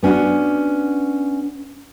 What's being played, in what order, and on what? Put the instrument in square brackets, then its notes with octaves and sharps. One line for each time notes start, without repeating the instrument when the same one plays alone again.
[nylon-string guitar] B3 C#4 D4 F#4